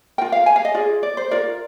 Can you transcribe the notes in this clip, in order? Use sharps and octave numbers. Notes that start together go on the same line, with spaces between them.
F4 A#4 G5
F5
G#5
F5
D#5
F4 G#4 D5
D5
C5
F4 A#4 D5